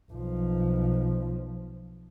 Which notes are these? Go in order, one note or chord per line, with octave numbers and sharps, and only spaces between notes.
B1 F3